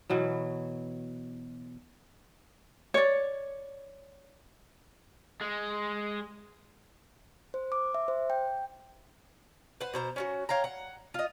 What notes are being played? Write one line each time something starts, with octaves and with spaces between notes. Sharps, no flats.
B2 E3 F#3
C#5 D5
G#3
C5
D6
E5
C5
G5
B4 C5 F#5
B2 C5 A#5
C#4 F4 F#4
C#5 F5 G5 A#5
F#5
F4 D#5